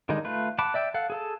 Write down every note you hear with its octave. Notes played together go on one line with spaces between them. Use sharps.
D3 D#3 G3 G#3 D#4
A3 F4 B4
F#5 A5 B5 D6
D5 E5 G5
A4 F5 F#5
G#4 A4 A5